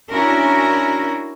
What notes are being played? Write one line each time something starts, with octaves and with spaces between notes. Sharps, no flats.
C#4 D4 E4 F#4 A#4